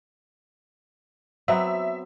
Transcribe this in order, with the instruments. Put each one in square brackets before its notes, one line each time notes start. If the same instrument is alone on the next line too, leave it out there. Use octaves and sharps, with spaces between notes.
[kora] F#3 B3 C4 [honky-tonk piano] E5